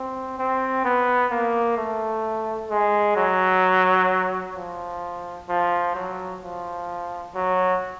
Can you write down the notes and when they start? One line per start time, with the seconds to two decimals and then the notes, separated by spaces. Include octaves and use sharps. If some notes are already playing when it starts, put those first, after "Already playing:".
Already playing: C4
0.39 C4
0.84 B3
1.31 A#3
1.77 A3
2.70 G#3
3.17 F#3
4.56 F3
5.49 F3
5.95 F#3
6.42 F3
7.35 F#3